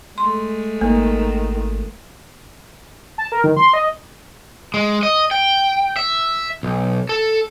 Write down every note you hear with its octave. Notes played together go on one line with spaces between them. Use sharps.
G#3 A3 C6
G#1 D#3 A#3
A5
A#4
D#3
C6
D#5
G#3
D#5
G5
E5
B1
A4